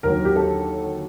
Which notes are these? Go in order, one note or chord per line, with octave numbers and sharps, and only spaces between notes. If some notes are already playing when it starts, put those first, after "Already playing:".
D#2 D3 F#3 A#4
G4
A4